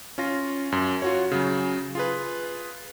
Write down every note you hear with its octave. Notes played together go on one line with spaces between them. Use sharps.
C#4 F4 A#6
F#2
F4 F#4 C#5
C#3 F#3
F4 G#4 B4